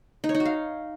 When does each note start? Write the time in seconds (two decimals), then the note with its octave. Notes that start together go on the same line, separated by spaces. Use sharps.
0.24 D#4
0.29 C#5
0.35 D#4
0.40 F#4
0.45 F5